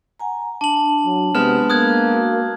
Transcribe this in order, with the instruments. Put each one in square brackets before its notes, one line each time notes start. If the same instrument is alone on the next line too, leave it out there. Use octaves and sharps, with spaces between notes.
[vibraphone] F#5 G#5 A#5
[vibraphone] D4 [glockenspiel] A5 F#7
[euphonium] F#3
[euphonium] C3 [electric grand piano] G#3 B3 E7 [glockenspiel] F6
[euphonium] A#3 [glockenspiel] D#6 F#6 G#6
[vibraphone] F#4